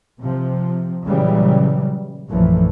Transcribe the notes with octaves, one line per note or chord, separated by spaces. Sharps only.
C3 F3
A#2 C#3 E3 F#3 G3
A#1 F#2 E3 F3 A3